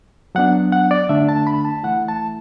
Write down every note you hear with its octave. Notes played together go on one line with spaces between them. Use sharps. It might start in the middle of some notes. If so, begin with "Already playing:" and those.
F#3 B3 D4 F#5
F#5
D5
D3 A3 D4 E5
A5
B5
A5
E3 A3 E4 F#5
A5